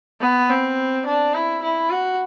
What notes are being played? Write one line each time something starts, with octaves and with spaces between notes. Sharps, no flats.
B3
C4
D4
E4
E4
F#4